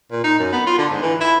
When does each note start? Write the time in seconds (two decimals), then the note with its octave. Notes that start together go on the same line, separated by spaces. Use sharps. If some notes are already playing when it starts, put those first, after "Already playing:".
0.11 A#2
0.24 D#4
0.39 F#2
0.52 B3
0.67 F4
0.78 D3
0.90 G#2
1.02 E3
1.21 E4